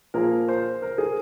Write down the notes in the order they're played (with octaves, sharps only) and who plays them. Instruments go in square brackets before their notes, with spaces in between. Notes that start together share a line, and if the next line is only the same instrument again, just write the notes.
[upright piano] A#2 F3 A#3 G#4 [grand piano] A#4
[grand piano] C5
A#4
G#4